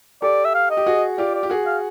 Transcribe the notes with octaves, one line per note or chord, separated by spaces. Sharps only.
G4 A4 D5
E5
F5
D#5
G4
F#4 G#4
F4 G4 D5
D5
G4
F#4 G#4
F5